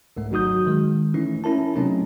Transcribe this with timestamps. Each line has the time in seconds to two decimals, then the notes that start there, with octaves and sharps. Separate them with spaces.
0.16 C2 G#2 A3
0.31 G#1 F#3 D#4 F#4 D#6 G6
0.67 D#3 G#3
1.14 E3 A3 C#4 D#4 E4
1.44 C#4 E4 A#4 A5
1.76 C3 F#3 A3 C4 C#4 D#4